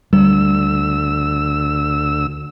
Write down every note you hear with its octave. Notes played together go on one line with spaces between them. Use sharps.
D2 G3 E6